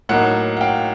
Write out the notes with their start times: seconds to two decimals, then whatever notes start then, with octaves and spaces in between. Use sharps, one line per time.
0.09 A2 F#3 A#3 D#4 F#5
0.57 F#5
0.61 F5 G5